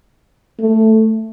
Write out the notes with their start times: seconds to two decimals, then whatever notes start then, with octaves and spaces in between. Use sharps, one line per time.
0.60 A3